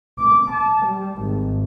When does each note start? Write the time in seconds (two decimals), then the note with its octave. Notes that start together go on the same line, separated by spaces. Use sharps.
0.19 D6
0.54 A5
0.85 G3
1.22 G#1